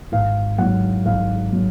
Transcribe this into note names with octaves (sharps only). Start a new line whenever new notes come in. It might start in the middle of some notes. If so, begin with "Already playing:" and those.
G#1 F5
G#2 F#3 F#5
G#1 F5
F#3